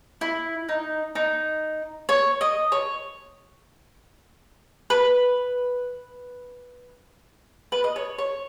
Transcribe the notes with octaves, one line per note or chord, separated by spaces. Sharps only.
E4
D#4
D#4
C#5
D#5
C#5
B4
B4
D#5
C#5
C#5